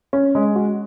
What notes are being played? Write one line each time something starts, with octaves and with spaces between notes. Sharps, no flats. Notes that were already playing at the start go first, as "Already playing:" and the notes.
C#4
G#3
F#4